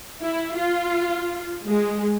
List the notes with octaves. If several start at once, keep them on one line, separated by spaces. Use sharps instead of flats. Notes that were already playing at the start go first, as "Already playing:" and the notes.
E4
F4
G#3